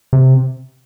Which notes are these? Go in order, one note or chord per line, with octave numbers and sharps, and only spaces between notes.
C3